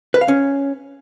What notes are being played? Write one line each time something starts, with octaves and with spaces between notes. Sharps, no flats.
B4
F5
C#4